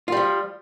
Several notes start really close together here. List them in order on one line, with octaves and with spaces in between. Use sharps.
F4 G3 F3